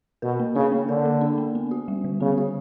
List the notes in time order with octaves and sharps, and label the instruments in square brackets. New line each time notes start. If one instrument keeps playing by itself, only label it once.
[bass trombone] B2 [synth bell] A#4
[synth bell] A#3
[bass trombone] C#3 [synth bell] D4
[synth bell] A#3
[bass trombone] D3 [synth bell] A#4
[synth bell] A#3
D4
A#3
B3
F#4
G3
D3
[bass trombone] C#3 [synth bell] B3
[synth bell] F#4